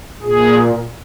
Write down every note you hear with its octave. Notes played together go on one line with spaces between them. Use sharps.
A#2 G#4